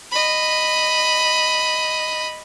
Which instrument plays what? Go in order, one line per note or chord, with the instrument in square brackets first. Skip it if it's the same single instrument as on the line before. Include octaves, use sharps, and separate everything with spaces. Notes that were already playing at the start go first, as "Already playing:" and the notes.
[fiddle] D#5 B5